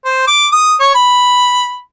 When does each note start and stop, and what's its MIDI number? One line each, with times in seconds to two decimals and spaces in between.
0.05 0.24 72
0.27 0.47 86
0.52 0.74 87
0.80 0.90 73
0.95 1.79 83